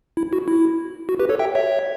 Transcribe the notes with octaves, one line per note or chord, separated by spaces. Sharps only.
E4
F#4
E4
F#4
G4 B4
A4 C#5
E5 G5
C#5 E5